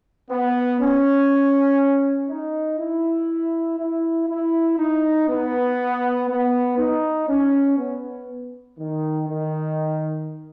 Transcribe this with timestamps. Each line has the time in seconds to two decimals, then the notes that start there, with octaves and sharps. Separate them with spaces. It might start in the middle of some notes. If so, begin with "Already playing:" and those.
0.30 B3
0.80 C#4
2.29 D#4
2.79 E4
3.79 E4
4.29 E4
4.78 D#4
5.29 B3
6.29 B3
6.78 D#4
7.28 C#4
7.78 B3
8.79 D#3
9.28 D#3